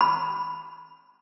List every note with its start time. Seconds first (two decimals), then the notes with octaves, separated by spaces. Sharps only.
0.01 B5